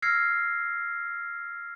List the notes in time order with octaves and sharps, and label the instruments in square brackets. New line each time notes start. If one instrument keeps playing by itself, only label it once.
[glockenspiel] E6 F6 G#6 A#6 C7 C#7